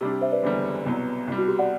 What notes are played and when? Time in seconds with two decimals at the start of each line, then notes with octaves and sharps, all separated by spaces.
0.01 C3 G3 D4 G4
0.12 G4
0.21 C5 E5
0.32 B4 D5
0.43 F#1 E2 D3 G3
0.86 C2 B2 F#3 B3
1.27 C2 B2 G3
1.38 F#4
1.48 G4
1.59 D5 F#5